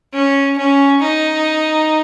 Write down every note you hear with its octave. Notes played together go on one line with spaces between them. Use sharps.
C#4
C#4
D#4